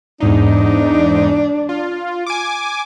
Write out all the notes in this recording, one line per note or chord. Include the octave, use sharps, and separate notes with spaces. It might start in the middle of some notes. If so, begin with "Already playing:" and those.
E2 G#2 D4 D#4
F4
G#5 D6